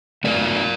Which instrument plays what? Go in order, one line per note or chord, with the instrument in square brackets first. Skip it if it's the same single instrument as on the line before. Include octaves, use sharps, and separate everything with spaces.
[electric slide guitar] F#2 F#3 A3 A#4 D5